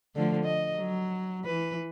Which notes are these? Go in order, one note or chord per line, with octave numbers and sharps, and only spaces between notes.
D3 F3 A3
D#5
F#3
E3 B4